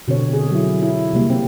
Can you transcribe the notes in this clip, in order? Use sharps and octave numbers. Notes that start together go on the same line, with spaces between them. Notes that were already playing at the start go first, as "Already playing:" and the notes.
B2 D3 C4 C#5
G#4
F#3 E4
E4
C3 G3 A#3
C4